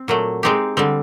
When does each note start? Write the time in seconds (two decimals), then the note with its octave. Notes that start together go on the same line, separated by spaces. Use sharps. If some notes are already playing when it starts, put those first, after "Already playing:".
Already playing: C4
0.08 A#2 F#3 A3
0.43 G#3 C4 D#4 G4
0.77 D3 G3 C4